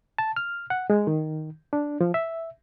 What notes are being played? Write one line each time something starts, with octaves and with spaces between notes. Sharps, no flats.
A5
F6
F#5
G#3
D#3
D4
F3
E5